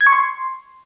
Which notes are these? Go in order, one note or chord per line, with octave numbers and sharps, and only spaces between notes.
G#6
C#6
C6